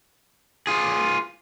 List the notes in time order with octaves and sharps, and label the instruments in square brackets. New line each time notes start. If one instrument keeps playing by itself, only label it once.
[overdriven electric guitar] F4 G#4